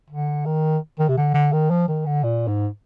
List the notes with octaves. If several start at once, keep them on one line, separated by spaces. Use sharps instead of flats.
D3
D#3
D#3
C3
D3
D3
D#3
F3
D#3
D3
A#2
G#2